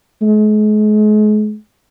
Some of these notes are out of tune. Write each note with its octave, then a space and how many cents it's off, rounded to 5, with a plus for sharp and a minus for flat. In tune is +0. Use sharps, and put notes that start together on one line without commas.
G#3 +40